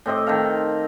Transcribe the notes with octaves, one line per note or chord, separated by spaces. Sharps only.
A2 C4 D#5 D6
D#3 C4 A4 F5